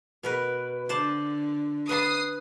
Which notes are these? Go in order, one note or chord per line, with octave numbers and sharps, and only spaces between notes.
B2 A#4 B4
D3 C5 D5 A5
B4 A5 D#6 C7